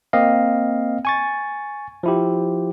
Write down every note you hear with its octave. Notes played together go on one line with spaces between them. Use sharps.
A#3 C4 D#5 F5
G#5 C#6 A6
F3 E4 G4